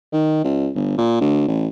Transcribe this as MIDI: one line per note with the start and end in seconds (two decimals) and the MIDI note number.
0.13 0.42 51
0.44 0.69 37
0.75 0.96 31
0.98 1.20 46
1.21 1.45 38
1.48 1.67 33